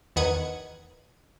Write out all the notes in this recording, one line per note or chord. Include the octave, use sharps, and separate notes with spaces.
E2 D#3 B4 F#5 D#6 G#6